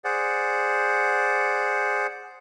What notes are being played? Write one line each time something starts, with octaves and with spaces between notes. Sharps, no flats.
G#4 C5 D5 F#5